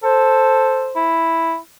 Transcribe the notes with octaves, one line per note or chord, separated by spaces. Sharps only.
A4 C5
E4